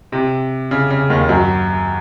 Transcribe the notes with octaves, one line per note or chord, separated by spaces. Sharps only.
C3
C#3
C#3
D#2 D#3
F#2 F#3